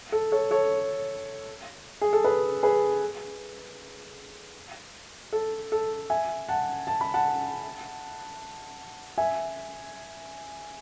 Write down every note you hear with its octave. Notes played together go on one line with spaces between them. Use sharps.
A4
A4 C#5
A4 C#5
G#4
A4
G#4 B4
G#4 B4
A4
A4
E5 G#5
F#5 A5
A5
B5
F#5 A5
E5 G#5